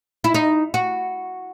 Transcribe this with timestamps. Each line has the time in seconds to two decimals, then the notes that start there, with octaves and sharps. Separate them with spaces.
0.24 E4
0.34 D#4
0.74 F#4